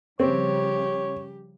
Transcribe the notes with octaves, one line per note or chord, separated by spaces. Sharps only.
C#3 F3 G3 C4 G4 C#5